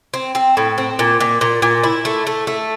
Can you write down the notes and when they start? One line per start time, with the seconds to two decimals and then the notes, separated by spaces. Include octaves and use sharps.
0.14 C4
0.35 C4
0.57 A2
0.78 C4
0.99 A#2
1.20 A#2
1.41 A#2
1.62 A#2
1.84 E4
2.05 A3
2.27 A3
2.47 A3